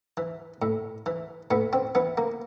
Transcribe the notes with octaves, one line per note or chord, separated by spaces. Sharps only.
E3
A2
E3
A2 B3
C4
E3 B3
A#3